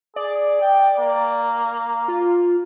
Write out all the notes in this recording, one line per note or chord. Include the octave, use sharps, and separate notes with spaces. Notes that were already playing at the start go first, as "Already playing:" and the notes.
G#4 D5
G5
A#3
F4